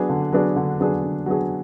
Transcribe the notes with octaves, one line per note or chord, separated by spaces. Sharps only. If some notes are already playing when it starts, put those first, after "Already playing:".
Already playing: F#3 B3 D4 G#4
D3
F#3 B3 D4 G#4
D3
F#3 B3 D4 G#4
D3
F#3 B3 D4 G#4